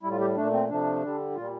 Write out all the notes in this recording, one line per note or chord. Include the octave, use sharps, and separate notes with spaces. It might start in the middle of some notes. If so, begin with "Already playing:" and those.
A2 G3 E4
F4
G4
A#2 A3 D4
C4
C3 F3 A3 D4
D3 G3
A#2 G3 F4